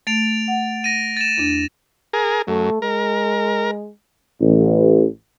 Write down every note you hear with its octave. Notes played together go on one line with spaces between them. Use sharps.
A3 A6 D7 F7
F#5
A6 A#6 D#7
A6 E7
E2 D4
G#4 A#4
F#2 A3
G#3 A#4
A1